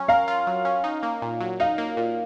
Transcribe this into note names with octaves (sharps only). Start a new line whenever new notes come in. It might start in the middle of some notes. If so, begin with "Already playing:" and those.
Already playing: F#3 C#4
A#4 F5
F4
F#3
C#4
D#4
A#3
A#2
F#3
D#4 F5
A#3
A#2